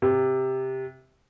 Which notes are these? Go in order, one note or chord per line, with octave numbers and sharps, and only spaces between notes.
C3